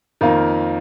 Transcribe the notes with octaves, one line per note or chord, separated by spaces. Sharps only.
F2 D#3 A#3 F4